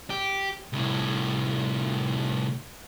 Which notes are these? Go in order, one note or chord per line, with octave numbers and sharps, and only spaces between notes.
G4
C2 A2